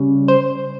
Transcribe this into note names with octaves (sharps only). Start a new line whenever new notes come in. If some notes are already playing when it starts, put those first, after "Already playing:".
Already playing: C#3 G3 C#4
C5